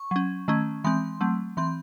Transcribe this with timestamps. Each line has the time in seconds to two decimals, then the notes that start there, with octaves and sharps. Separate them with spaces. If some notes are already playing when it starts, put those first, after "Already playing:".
Already playing: C#6
0.11 F#3 C#4
0.48 D#3 A3 C#4
0.84 E3 G#3 C4 C6
1.21 F#3 A3 C4
1.57 E3 C4 C6